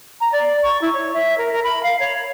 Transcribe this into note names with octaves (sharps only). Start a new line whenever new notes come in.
A#5
D5
C#6
E4
C#5
E5
A#4
A#4
B5
F5
C#5